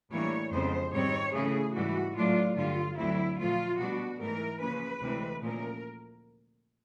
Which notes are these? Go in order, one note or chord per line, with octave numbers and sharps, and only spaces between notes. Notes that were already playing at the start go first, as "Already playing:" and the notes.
A2 E3 G3 A#3 D4 C#5
F2 C#3 F3 G#3 B3 C5
G#2 D#3 G3 C4 C#5
C#3 E3 A3 C#4 G#4
G#2 E3 G3 F#4
A2 F#3 A3 D4 F4
G2 D3 G3 F4
D2 D3 F#3 A3 C4 E4
A#2 F3 A3 F4
B2 G3 B3 D4 F#4
G#2 E3 A3 A#4
C#3 F3 A#3 C#4 B4
D2 C3 E3 G#3 C4
A#2 F3 A3 C#4 A#4